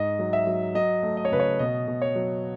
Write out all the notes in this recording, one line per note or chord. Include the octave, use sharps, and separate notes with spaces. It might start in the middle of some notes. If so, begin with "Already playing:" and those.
Already playing: G#2 D#5
F#3
E5
F#3
F#3 D#5
A3
D#5
C#5
C#3 B4
C#5
B2 D#5
B2
C#5
F#3